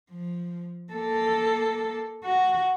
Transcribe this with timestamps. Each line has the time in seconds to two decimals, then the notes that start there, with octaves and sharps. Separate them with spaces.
0.11 F3
0.93 A#3 A4
2.24 F#4